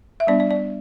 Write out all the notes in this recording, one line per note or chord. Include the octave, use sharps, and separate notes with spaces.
E5
G3 B3 D4 D5
D5
D5